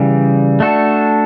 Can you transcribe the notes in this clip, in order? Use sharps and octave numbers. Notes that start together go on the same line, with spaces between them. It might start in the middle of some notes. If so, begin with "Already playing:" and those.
Already playing: C#3 E3 G3
A3 D4 F#4 A4